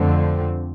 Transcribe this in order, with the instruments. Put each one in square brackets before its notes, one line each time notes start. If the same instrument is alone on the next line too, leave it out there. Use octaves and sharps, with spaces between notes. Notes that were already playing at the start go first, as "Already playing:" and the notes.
Already playing: [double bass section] F2 D3 F3 A3 C4